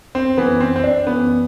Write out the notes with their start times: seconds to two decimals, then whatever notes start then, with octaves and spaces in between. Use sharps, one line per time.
0.15 C4
0.37 F#2 E3 B3
0.60 C4
0.76 C4
0.84 D4
1.06 F#2 E3 B3